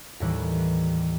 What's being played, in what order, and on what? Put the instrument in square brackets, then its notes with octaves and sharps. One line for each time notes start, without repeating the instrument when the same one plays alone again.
[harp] D#2 A2 E3 G3 B4